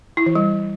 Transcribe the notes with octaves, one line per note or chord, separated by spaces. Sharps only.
E4
E3
G3